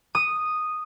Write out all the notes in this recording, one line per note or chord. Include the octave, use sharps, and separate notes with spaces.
D#6